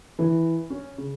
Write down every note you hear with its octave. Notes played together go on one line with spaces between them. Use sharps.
E3
C#4
C#3